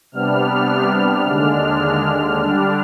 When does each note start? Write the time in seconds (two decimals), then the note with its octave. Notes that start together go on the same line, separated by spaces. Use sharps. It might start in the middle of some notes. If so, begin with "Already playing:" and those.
0.12 C3 G3 B3 D4 F6
1.26 D#2 D3 G#3 D4 F6
2.41 D3 G3 D4